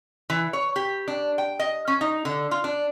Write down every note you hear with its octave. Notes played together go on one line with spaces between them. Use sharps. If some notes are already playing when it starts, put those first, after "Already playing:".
E3
C#5
G4
D4
G5
D#5
C#4
D#4
D3
F4
D4